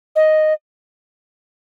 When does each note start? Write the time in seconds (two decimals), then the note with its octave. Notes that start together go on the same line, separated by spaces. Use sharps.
0.16 D#5